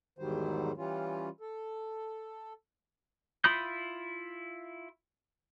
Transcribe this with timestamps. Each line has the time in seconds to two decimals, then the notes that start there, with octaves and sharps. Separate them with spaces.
0.19 E2 G#2 D#3 F#3 G3 C5
0.77 E3 G3 C#4 F4
1.40 A4
3.44 E4 F4 B5 D#6 G6